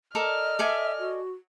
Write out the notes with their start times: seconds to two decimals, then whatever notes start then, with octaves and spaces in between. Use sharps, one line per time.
0.15 A4 A#4 D5 D#5 F6
0.59 A4 D5 E5 G#5
0.99 F#4